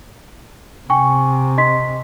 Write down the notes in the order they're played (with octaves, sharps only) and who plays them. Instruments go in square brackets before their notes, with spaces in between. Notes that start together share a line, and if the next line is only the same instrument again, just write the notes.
[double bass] C3 [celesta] G5 G#5 C#6
[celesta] D#5 C6 B6